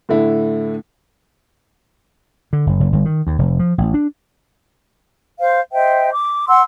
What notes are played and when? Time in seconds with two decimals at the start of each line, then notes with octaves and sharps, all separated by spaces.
0.09 A2 D3 A3 E4
2.53 D3
2.66 F#1
2.80 F#1
2.92 G1
3.05 D#3
3.27 D#2
3.39 F1
3.59 F3
3.78 A1
3.94 D4
5.38 C5 F5
5.72 C5 D#5 E5 G5
6.10 D6
6.48 F#5 C6 E6